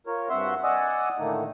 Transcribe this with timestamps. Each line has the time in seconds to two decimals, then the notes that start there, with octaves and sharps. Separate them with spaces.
0.07 F4 A#4 C#5
0.29 G2 C4 F#4 E5 F#5 C6
0.64 D5 D#5 F#5 G#5 D#6 E6
1.18 A2 D3 D#3 A3 A#3 D#4